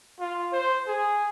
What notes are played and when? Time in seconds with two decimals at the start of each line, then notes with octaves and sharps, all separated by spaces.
0.19 F4
0.53 C5
0.87 G#4